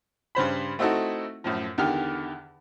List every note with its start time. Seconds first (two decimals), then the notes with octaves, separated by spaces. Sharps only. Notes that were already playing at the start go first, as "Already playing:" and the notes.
0.35 G2 C#3 C5 B5
0.79 A3 C4 D#4 E4 F#4 A4
1.44 F#2 A2 F3
1.78 E2 D3 D#3 G4 F6